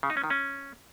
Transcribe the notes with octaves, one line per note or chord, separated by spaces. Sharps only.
C#3
D#4
C#4
D#3
C#4